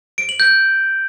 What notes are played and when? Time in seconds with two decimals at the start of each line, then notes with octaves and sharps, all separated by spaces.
0.18 D7
0.29 F#7
0.40 G6